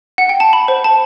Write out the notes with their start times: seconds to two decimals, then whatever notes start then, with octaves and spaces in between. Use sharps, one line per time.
0.18 F#5
0.29 G5
0.40 A5
0.53 B5
0.68 C5
0.84 A5